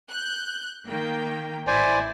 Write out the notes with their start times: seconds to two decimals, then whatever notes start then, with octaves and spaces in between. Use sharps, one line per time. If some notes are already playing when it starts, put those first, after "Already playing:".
0.10 F#6 G6
0.88 D#3 A#3 G5
1.67 A1 E4 C5 D5 G#5